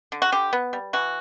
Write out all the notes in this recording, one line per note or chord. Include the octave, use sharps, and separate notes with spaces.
D3
F#4
D3 G4
B3
G3
E3 F#4